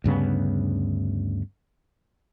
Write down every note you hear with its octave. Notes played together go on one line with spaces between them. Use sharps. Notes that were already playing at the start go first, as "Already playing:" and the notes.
D2 G2 C#3 B3